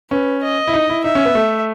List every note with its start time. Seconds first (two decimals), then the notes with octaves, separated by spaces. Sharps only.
0.11 C#4 B4
0.43 D#5
0.67 E4
0.74 D#4
0.90 E4
1.04 D#4 E5
1.15 C#4
1.25 B3
1.35 A3